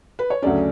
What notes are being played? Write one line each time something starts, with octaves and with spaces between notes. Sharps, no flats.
B4
C#5
D2 C#3 F#3 A3 C#4 D5